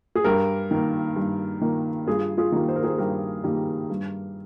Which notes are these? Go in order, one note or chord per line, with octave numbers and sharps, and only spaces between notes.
G#4
G2 G4 A#4
D#3 A#3
G2
D#3 A#3
G2 F4 G#4
F4 G#4
D#3 G3 A#3
C5
A#4
G#4 C5
G2 G4 A#4
D#3 G3 A#3
G2